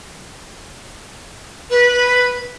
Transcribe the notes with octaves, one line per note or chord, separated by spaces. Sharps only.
B4